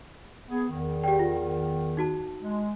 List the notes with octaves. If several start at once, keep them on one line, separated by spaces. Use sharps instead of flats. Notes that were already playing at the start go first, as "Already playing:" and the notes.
B3 G#4
E2 D#3
G4 D5 G5
F4
D#4 F#4 A5
G#3